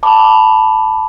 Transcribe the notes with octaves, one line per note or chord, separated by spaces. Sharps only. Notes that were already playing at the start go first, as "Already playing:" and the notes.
A5 B5 D6